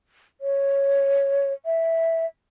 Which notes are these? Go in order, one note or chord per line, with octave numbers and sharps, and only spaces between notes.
C#5
E5